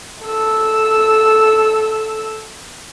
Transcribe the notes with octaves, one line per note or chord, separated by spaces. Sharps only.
A4 E6